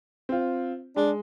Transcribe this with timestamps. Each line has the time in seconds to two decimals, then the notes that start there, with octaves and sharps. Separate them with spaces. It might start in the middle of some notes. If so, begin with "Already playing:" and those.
0.29 C4 F4
0.96 G#3 D4